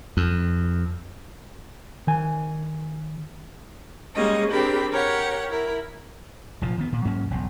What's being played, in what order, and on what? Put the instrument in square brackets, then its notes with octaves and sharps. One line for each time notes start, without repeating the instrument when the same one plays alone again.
[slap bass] F2
[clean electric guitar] D#3 G#5
[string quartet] G3 G#3 A#3 C#4 D#5
C4 D4 G4 G#4 A#4 B5
G4 A#4 C#5 F#5
E4 A#4
[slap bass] F1 A#2 F3
D#3 B3
A#2
G#2 F#3 A#3 C#4
E1 B1